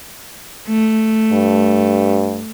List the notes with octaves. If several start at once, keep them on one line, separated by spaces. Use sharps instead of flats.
A3
G2